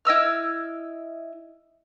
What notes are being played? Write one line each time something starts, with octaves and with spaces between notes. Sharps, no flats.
E4 D#5 E6 F6